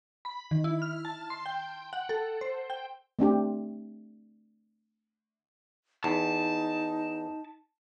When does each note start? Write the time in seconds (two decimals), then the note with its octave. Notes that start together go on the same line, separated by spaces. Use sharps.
0.25 B5
0.51 D#3
0.64 E4
0.82 F6
1.05 A5
1.30 C6
1.46 G5
1.93 F#5
2.09 A4
2.41 C5
2.70 G5
3.19 A3 C4 D4 G4
6.04 E2 D#4 A5